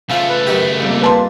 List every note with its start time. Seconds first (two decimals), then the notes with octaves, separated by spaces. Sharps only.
0.10 C#3 F3 A3 F4
0.29 B4
0.47 F#2 D#3 G4
0.80 C2 F2 A#3
1.02 B4 A5 C6